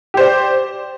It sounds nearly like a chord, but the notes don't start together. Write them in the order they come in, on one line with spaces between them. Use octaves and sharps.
G4 C5 D5